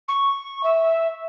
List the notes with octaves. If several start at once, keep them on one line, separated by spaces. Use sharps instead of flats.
C#6
E5